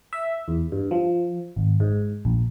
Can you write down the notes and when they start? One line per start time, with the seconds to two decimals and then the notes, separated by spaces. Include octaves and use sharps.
0.13 E5
0.48 E2
0.72 G2
0.91 F3
1.56 G#1
1.80 G#2
2.25 A#1